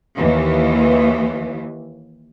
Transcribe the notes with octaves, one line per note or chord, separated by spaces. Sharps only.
D#2 E3